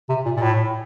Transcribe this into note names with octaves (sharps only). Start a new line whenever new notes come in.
C3
A#2
A#2
A2